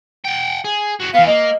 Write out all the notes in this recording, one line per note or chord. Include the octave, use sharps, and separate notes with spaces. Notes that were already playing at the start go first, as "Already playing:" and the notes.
F#5 G5
G#4
F#4 G#4
E3 B3 F5
A#3 D#5